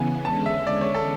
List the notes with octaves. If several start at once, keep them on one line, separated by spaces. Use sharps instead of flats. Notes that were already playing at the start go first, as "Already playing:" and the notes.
Already playing: C#3 E3 B3 G#5
E2 D3 G#3 C#4 A5
E5
D5
C#5
A4